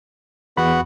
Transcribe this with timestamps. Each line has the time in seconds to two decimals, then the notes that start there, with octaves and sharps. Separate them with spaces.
0.57 E2 B3 F#4 F#5 B5